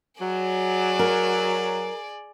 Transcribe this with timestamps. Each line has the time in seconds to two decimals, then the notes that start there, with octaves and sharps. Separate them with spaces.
0.21 F#3 G#4 D5
0.99 A#4